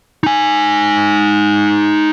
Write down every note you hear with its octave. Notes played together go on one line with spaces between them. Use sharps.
D#4 G#5